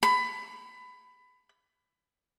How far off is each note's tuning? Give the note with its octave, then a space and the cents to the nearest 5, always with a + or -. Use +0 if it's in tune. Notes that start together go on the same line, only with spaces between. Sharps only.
B5 +20